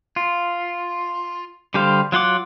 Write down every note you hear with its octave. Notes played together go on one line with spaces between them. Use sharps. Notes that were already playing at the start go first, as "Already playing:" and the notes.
F4
D3 G3 G4 C5 F5
F#3 F4 F#5 D6